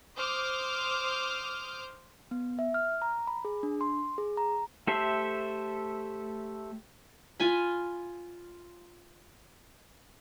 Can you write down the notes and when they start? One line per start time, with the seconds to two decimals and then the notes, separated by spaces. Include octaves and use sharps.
0.16 C5 D6 D#6 F6 G6
2.31 B3
2.59 E5
2.74 F6
3.02 A#5
3.27 B5
3.45 G#4
3.63 D4
3.81 C6
4.18 G#4
4.37 A#5
4.87 A3 G4 A4 C5 E5
7.40 F4 G#5 B5